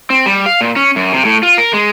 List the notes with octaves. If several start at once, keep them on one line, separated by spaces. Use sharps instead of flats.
C4
G3
F5
A#2
C#4
F#2
C3
A2
F4
A#4
G#3